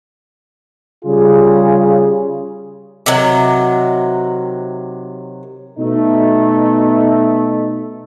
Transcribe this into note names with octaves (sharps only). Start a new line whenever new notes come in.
C#3 G3 F4 G#4
C3 D#3 F#3
B2 A3 D#4